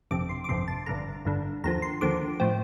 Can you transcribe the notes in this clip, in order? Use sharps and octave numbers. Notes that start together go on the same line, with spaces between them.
G1 F2 C3 D6
C6
D6
G1 F2 C3 C6
A5
G1 G2 D3 A#5
G1 G2 D3
D#2 D3 F3 A#5
C6
D#2 D3 F3 D6
A2 F3 C4